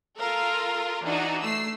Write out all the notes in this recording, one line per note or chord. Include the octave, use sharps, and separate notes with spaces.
F4 A4 A#4 F5
E3 D4 D#4 F#4
A3 E6 C7